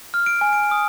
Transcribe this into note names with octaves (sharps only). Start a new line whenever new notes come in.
F6
D7
G#5
D7
D#6